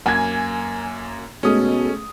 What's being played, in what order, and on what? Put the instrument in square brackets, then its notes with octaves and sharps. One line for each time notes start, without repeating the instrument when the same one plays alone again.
[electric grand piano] F#2 A#3 [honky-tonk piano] G#5 G#6
[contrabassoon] B2 [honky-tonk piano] G#3 A3 [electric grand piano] C#4 D#6